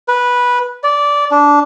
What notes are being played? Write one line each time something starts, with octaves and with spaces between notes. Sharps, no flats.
B4
D5
D4